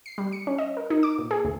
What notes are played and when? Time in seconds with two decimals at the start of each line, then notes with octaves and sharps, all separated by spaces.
0.06 C7
0.18 G3
0.32 C#7
0.47 C#4
0.58 D#5
0.77 A#4
0.90 D#4
1.03 D6
1.18 A#2
1.31 G#4
1.44 D2